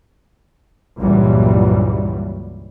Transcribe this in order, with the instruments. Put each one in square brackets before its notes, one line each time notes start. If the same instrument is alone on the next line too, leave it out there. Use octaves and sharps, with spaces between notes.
[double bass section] C#2 G2 A#2 E3 F#3 G3